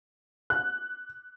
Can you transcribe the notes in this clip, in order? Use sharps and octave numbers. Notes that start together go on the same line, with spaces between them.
F#6